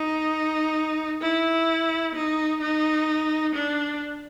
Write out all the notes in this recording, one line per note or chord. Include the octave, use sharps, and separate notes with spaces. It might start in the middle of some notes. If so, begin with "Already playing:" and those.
Already playing: D#4
E4
D#4
D#4
D4